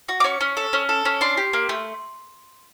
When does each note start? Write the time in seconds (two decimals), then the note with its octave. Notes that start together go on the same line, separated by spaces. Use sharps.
0.09 F#4
0.20 D6
0.24 C#4 C#6
0.41 C#4
0.57 A4
0.73 C#4
0.89 A4
1.05 C#4
1.21 D4 C6
1.37 G4
1.53 A#3
1.69 A3